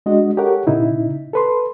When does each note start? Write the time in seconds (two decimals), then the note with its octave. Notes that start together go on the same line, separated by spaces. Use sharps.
0.06 G#3 D4 F#4 D#5
0.37 G4 A4 A#4 C#5 F#5
0.67 A#2 C#3 D#4 E4
1.33 A4 B4 C6